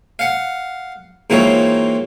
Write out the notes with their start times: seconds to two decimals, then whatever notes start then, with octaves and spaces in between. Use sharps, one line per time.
0.19 F5 F#5
1.30 G#2 E3 A#3 C4 F4 C#5